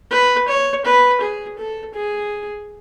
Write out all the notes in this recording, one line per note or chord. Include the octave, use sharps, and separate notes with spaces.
B4
C#5
B4
G#4
A4
G#4